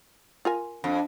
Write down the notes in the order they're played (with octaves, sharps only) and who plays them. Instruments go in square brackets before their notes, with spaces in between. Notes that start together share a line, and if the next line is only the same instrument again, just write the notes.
[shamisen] F4 A#4 G#5
[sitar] F2 [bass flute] D4